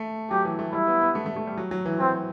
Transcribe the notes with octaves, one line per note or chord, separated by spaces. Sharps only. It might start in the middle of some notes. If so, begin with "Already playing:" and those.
Already playing: A3
F#3 G4
E3
A3
G3 E4
B3
B3
A3
A3
A3
G3
F#3
F#3
E3
F#3 C4